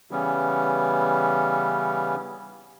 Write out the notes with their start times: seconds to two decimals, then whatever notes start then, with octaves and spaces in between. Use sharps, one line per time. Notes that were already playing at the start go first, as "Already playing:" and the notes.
0.11 C#3 E3 G3 B3 C#4